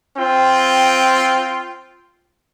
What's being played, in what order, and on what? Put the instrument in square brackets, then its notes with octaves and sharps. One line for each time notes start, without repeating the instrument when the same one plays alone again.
[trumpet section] C4 F4 G5